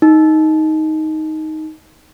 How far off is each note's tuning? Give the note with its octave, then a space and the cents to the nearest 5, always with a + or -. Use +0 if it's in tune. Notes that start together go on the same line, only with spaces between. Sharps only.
D#4 +10